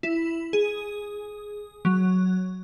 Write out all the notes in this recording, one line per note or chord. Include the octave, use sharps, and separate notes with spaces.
E4
G#4
F#3